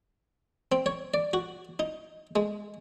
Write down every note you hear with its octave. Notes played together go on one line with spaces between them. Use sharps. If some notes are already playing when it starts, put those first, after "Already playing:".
C4
C#5
D5
F#4
D#4
G#3